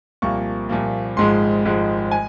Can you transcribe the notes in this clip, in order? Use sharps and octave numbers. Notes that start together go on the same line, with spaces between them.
C2 A#2 F3 A#3 C#6
C2 A#2 F3 A#3
G#1 G#2 F3 G#3 C6
G#1 G#2 F3 G#3
G#5